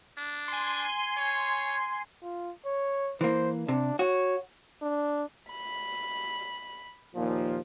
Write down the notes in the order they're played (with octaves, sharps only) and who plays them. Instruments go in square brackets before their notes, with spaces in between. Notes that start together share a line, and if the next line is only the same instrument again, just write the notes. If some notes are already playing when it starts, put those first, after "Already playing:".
[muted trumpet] D4
[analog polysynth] G#5 C6
[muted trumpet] C#5
[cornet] F4
C#5
[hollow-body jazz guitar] E3 A#3 [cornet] C5
[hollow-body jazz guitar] C3 [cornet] D4
[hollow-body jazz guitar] F#4 [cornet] C#5
[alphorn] D4
[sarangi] B5
[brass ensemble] D#2 A#2 F3